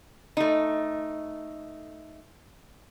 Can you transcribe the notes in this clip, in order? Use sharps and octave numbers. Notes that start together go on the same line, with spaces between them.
A3 D#4